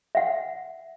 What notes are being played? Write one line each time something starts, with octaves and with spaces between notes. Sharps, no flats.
E5 F#5